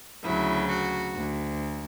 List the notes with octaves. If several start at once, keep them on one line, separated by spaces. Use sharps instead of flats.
D2 C#3 F#3 E4
F#4
D2